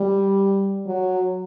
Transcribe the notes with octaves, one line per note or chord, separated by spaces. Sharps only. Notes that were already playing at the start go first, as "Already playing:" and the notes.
Already playing: G3
F#3